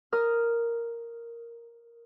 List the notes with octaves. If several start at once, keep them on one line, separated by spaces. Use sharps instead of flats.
A#4 D#6 F6